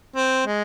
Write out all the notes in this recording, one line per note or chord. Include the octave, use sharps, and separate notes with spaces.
C4
G#3